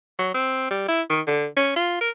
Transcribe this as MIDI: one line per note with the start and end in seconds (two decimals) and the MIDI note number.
0.19 0.32 54
0.34 0.69 60
0.71 0.86 55
0.88 1.01 64
1.10 1.21 51
1.27 1.47 50
1.57 1.74 61
1.76 1.99 65
2.01 2.10 70